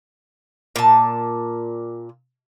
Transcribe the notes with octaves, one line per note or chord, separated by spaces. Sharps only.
A#2 A5